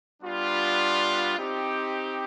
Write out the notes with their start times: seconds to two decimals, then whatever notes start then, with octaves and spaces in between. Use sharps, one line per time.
0.22 G3 B3 D4 F4
1.38 C4 D#4 G4